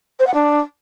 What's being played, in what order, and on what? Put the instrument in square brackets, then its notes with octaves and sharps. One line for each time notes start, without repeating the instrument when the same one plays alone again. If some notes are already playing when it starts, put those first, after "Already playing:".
[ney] C5
F#5
D4